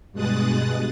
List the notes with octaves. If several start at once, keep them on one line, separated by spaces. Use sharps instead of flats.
G2 B2 G#3 D#6 F#6 A6